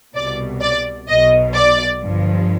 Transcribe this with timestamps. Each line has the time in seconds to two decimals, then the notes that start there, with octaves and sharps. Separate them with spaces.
0.14 C2 B2 D5
0.62 D5
1.08 B1 B2 D#5
1.54 D5
2.02 G1 G2 F3